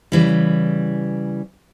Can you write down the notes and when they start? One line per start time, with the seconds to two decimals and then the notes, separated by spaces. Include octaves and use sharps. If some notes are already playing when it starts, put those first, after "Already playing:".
0.12 C#3 E3 G3